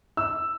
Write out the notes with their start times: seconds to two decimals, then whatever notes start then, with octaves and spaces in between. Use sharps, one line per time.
0.17 E6